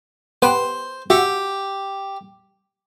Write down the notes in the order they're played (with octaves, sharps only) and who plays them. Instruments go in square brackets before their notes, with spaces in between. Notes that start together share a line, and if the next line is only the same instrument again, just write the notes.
[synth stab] B3 G4 B4 [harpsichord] C5
[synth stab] F#4 E5 [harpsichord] G4